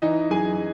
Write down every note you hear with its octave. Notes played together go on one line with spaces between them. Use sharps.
E3 D#4 D#5
F#2 G#4 G#5